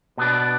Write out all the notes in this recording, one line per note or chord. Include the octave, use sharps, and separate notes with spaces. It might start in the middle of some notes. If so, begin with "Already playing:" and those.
B2 B3 D4